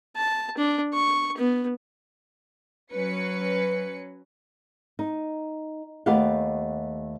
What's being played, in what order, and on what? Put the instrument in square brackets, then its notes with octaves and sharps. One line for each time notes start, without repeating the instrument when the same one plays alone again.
[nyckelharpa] A5
D4
C#6
B3
[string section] F#3 C#4 B4 C#7
[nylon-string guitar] D#4
D#2 A3 B3 G4 F5 F#5